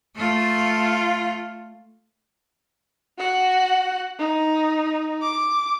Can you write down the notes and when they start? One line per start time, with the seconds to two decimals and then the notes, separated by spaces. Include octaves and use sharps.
0.16 A3 F4
3.18 F#4 F#5
4.19 D#4
5.22 D6